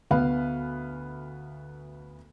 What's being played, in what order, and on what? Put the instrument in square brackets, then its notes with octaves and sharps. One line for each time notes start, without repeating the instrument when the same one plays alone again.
[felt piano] D2 B3 F5 B5